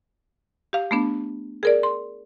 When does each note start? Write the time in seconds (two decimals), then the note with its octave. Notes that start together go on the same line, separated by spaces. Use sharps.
0.73 G4 F5
0.91 A3 B3 D4
1.63 G#4 A#4 D5
1.83 C6